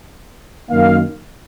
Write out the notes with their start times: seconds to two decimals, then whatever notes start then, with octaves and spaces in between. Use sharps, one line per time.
0.68 F#2 D#3 A#3 F5